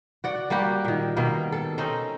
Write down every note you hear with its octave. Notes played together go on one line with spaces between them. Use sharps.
F#4 D5 F#5
G3 A#3 F#4 G4
A#2 D#3
B2 D#3 A#3
A4
C4 C#4 D#4